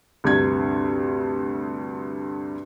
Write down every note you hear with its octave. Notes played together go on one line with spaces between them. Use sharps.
D2 G2 C3 G#6